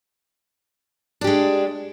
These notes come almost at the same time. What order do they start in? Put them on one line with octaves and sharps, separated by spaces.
D4 G4 G#3